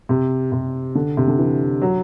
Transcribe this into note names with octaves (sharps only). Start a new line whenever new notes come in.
C3
C3
D3
C3
D3
E3
F#3